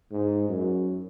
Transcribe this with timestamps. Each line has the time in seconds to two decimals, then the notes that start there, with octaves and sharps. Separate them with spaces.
0.12 G#2
0.49 F#2